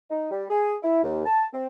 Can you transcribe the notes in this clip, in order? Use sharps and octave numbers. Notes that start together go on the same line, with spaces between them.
D#4
G3
G#4
E4
D#2
A5
C4